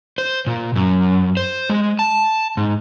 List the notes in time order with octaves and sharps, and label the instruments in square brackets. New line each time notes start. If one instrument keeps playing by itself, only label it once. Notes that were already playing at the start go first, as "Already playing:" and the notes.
[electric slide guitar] C5
A#2
F#2
C5
G#3
A5
G#2